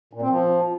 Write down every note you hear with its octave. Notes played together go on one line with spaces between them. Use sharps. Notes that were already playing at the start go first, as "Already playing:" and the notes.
A#2
C4
F3